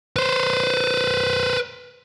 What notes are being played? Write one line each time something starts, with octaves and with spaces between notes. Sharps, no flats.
B4 C5